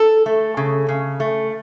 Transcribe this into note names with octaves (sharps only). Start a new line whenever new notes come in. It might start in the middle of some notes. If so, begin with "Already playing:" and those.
Already playing: A4
A3
C#3
C#3
A3